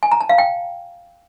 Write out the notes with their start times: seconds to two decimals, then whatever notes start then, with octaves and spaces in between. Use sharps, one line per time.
0.03 G#5
0.12 A#5
0.20 A5
0.29 F5
0.38 G5